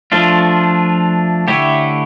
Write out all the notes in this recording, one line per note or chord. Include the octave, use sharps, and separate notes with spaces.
F3 A3 D4 F4
D3 A3 E4 G4 C#5